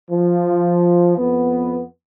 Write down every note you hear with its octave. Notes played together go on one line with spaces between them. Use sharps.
F3
F2 B3